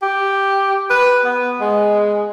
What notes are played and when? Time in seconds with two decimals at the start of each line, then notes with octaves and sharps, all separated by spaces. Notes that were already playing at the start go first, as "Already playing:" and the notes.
0.02 G4
0.90 B4
1.25 B3
1.61 G#3